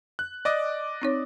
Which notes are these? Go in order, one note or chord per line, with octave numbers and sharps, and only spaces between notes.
F#6
D5 D#5 D6
C4 D#4 C#5